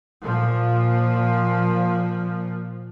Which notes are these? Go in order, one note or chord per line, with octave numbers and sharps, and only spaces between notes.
A#2 F3